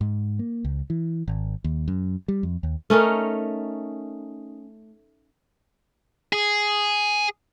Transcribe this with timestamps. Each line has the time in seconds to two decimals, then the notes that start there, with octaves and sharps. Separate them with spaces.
0.01 G#2
0.39 A#3
0.65 C#2
0.90 E3
1.28 G#1
1.64 D#2
1.88 F#2
2.28 G3
2.43 F2
2.63 D#2
2.90 A3 C#4 D#4 A#4
6.33 G#4